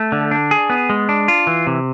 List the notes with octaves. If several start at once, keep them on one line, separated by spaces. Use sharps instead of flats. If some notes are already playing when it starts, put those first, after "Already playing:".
Already playing: A3
D3
D4
G#4
B3
G#3
D4
F4
E3
C3